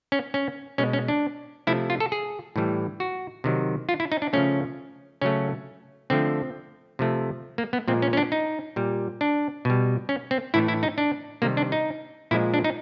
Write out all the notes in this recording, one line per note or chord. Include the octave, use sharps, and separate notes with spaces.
C#4
C#4
B2 G#3 C#4
C#4
D4
C3 F3 A3 E4
F4
A4
G#4
A2 E3 G3
F#4
C3 D#3 F#3
F4
E4
D#4
D4
C#3 F3 A3 C#4
C#3 F#3 A3 C#4
D3 F3 A3 C4
C3 F3 A3
A#3
B3
A#2 F3 G#3 C4
C#4
C#4
D4
D#4
A#2 G3
D4
B2 G3
C#4
C4
A2 E3 A3 E4
E4
D#4
D4
C3 D#3 G3 A#3
D4
D#4
A#2 F3 G#3 E4
D4
D#4